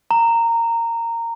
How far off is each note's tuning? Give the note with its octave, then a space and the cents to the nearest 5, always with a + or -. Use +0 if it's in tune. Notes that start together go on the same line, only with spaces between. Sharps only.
A#5 -15